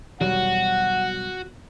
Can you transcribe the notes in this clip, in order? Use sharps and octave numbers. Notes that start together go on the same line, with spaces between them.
B1 E2 B2 D#3 F#3 G3 F#4 F#5